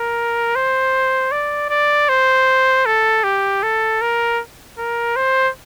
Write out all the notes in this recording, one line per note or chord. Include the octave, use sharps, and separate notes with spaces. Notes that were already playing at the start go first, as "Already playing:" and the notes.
Already playing: A#4
C5
D5
D5
C5
A4
G4
A4
A#4
A#4
C5